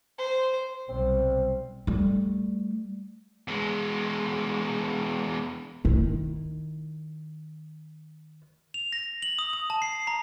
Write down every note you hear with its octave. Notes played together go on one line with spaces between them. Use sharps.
C5
B1 C3 G3 C4
G3 A3
E2 G#3
D#3 E4
F7
A#6
F#7
D#6
D#6
A5
C7
A#5